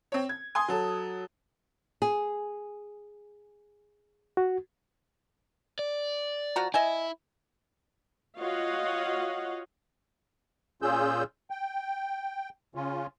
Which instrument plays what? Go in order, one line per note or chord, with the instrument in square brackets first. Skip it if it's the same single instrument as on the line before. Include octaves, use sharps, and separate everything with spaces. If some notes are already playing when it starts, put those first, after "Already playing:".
[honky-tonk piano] C4 C#5
G#6
G#5 C6 D#6
F#3 A4
[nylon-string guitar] G#4
[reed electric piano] F#4
[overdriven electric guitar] D5
[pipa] F3 F#4 A#5
[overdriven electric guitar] E4 [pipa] D#5 E5 G#5
[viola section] F4 F#4 C#5 D#5 F5 F#5
[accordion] A#2 C#4 F4 G#4 E6 G6
G5
C#3 C#4 F4